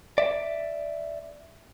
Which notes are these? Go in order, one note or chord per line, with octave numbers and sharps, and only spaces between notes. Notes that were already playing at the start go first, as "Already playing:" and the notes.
D5 E5